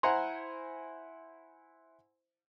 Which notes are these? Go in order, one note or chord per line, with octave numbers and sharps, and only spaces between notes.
E4 C5 F#5 G#5 A#5 C6